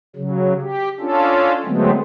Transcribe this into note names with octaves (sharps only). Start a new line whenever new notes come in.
C#3 F#3
G4
C#4 D4 F4 A4
D3 F#3 G#3 A3 B3 C4